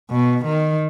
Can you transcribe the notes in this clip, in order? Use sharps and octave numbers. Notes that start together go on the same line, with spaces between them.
B2
D#3